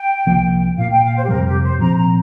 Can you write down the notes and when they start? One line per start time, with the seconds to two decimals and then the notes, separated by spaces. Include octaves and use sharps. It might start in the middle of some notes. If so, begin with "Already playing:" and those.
Already playing: G5
0.27 C2 C3 F3 A#3
0.77 A#2 A#3 F5
0.91 G5
1.04 F5
1.16 C5
1.24 G4
1.28 F2 C3 G3 A#4
1.46 G4
1.63 C5
1.79 A#2 F3 C4 A#5
1.96 A#5